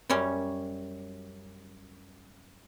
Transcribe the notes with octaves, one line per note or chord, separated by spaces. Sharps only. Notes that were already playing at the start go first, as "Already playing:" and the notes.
F#2 G3 C#4